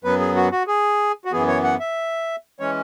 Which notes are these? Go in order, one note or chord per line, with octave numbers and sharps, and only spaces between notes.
F#2 F#3 B3 B4
G#4
F#4
F#4
G#4
F#4
F#2 E3 B3 G#4
C#5
F#5
E5
E3 G#3 C#4 C#5